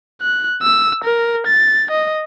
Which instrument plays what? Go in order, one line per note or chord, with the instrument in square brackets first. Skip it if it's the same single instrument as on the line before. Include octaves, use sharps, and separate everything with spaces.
[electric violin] F#6
E6
A#4
A6
D#5